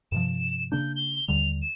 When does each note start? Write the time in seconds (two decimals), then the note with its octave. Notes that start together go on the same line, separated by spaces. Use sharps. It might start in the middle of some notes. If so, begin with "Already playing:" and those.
0.12 G2 C3 F3 E7
0.72 C#3 A#3 D4 G6
0.96 G7
1.28 D#2 D3 G3 F7
1.62 E7